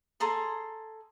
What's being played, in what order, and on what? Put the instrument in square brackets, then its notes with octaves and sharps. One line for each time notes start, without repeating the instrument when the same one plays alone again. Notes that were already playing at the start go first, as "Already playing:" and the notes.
[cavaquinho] G#4 A4 A#5 C6